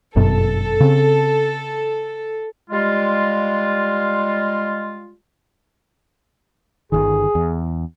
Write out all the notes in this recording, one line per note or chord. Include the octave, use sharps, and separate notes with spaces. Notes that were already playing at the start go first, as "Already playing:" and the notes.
G1 F#2 B2 A4
C#3 C4
G3 G#3 F4
G1 C2 D#3 G#4
E2